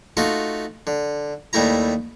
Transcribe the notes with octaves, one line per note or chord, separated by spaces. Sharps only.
A3 D#4 F4 F#4
D3
D#2 G3 A3 E4 A#5